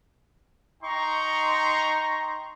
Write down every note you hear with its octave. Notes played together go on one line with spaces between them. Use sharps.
D#4 G5 A#5 C6 C#6